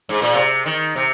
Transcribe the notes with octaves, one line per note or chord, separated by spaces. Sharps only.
G#2
A#2
C3
D#3
C3